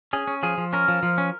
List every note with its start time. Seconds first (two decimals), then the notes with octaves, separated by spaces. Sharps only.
0.13 C#4 G#4
0.27 C#4
0.43 F3 G#4
0.58 F3
0.73 C#4 A#4
0.88 F3
1.03 F3
1.18 C#4